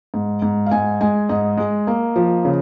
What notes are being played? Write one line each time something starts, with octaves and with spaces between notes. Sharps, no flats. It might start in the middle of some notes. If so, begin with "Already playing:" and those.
G#2
G#2
F5
G#2 G#5
G#3 G#5
G#2 D#5
G#3
A#3
F3
C#3